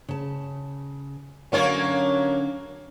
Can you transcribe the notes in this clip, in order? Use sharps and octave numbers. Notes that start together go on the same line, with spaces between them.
C#3 A5
D3 F#3 A#3 C#4 C#5 A5